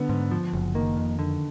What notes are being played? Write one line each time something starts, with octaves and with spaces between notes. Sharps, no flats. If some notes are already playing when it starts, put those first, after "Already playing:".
Already playing: D3 B3
G#2
F3
F#1
D#3 A#3
F2
D3